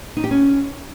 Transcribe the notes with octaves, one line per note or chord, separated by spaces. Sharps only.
D#4
G4
C#4